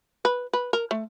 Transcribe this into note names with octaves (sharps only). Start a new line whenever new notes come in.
B4
B4
A#4
A3